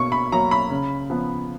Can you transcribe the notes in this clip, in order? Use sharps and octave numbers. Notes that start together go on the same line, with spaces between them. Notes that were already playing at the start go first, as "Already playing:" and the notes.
Already playing: B2 A#3 C#6
B5
F#3 A#3 A#5
B5
C#3
F3 B3